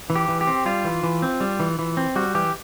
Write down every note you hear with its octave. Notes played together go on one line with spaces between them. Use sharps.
E3
G4
E3
G4
C4
G3 F4
E3
E3
C4
G3
E3
E3
C4
G3 F#4
E3 G4